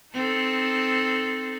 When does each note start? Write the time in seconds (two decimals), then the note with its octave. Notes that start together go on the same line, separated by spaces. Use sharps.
0.14 C4 D#4 A4